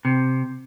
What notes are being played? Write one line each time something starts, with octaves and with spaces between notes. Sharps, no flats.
C3